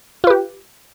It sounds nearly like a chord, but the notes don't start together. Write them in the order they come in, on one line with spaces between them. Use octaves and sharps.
F4 B4 G4